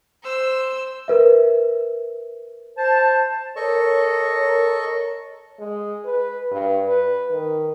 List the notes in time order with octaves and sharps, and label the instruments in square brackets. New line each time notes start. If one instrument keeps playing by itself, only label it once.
[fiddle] C5 E6
[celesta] A#4 B4 E5
[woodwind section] C5 A5
[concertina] A4 D#5 C#6 [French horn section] A#4 C#5
[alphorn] G#3
B4
G2
B4
D#3